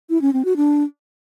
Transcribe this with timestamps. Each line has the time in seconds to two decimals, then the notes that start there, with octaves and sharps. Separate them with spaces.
0.10 E4
0.21 C#4
0.33 C4
0.45 F#4
0.56 D4